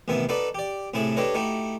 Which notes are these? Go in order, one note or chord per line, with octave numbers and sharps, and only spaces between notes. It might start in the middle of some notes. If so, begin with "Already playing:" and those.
A1 C3 D#3 B3 E5
D#4 F#4 A4 B4 D5
G4 D5
A2 C3 A3 E4 G#4 A4
D4 G4 A4 B4 C#5 D#5
A3 D#4 E4 F#4 G4